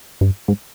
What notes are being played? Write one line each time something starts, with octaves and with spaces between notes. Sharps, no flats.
G2
G#2